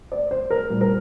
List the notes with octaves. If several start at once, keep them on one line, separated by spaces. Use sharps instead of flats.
D5
C5
A#4
A#2 G3
A#4